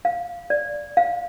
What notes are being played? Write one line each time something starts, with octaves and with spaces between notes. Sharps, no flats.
F5
D5
F5